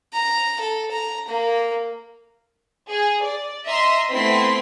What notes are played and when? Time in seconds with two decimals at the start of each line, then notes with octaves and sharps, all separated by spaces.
0.13 A#5
0.60 A4
0.91 A#5
1.28 A#3
2.91 G#4
3.23 D5
3.67 D#5 E5 A#5 C6
4.12 A3 B3 C4 E4 C6 B6